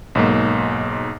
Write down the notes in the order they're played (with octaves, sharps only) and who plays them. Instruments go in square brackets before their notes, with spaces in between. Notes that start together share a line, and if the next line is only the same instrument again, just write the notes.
[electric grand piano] B1 G#2 A#3